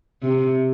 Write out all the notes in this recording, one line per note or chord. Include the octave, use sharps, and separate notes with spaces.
C3